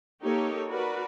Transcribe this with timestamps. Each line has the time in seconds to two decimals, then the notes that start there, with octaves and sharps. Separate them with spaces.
0.22 A#3 D#4 G4 A4 C#5
0.70 F#4 A#4 B4 D5